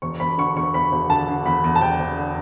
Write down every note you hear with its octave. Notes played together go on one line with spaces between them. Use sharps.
E1 C#6
E1 B5
D3 C#6
E1 C#6
E1 B5
E1
D3 A5
D3
E2 B5
E2
A5
E1 G5
E1
D3